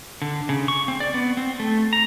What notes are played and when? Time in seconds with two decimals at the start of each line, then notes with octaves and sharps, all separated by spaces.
0.22 D3
0.49 C#3
0.68 C#6
0.88 C4
1.00 D5
1.14 B3
1.37 C4
1.60 A3
1.93 A#5